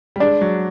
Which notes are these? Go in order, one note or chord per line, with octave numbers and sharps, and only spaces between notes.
G3
G#3 D4
F#3